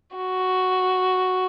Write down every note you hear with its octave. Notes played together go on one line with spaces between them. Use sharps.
F#4